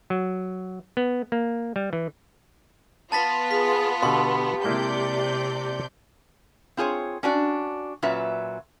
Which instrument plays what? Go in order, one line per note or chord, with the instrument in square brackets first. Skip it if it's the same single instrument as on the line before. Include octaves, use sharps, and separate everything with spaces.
[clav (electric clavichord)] F#3
B3
A#3
G3
E3
[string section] B3 F4 [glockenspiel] A5 A6 B6
[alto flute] G#4 [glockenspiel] B6
[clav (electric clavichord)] B2 D3 [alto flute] G4 [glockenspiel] C6
[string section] C3 D5 G6 [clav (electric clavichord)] G#3 A#3 E4
[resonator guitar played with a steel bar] C4 F4 G#4 C5 C#5
C#4 D4 F#4 D5
A#2 F#3 C#4 F4 B4 E5